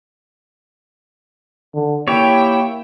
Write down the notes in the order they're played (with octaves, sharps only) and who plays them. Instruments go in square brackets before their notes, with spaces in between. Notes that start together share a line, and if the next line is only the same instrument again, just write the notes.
[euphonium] D3
[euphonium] A#3 [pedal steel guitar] E4 G4 C#5 [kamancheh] G5